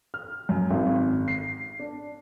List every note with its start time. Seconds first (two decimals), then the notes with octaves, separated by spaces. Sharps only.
0.14 F6
0.49 F#2
0.71 G#1
1.28 C7
1.79 D4